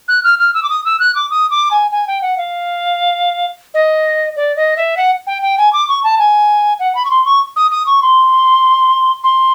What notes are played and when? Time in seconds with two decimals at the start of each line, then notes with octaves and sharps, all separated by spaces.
0.08 F#6
0.24 F6
0.39 F6
0.54 E6
0.63 D6
0.70 D#6
0.85 E6
1.00 F#6
1.15 D6
1.30 D#6
1.51 D6
1.71 G#5
1.91 G#5
2.07 G5
2.22 F#5
2.37 F5
3.74 D#5
4.36 D5
4.56 D#5
4.77 E5
4.97 F#5
5.27 G5
5.42 G5
5.58 G#5
5.73 D6
5.89 C#6
6.04 A5
6.19 G#5
6.79 F#5
6.95 B5
7.05 C#6
7.10 C6
7.26 C#6
7.56 D#6
7.71 D#6
7.86 C#6
8.02 C6
9.24 C6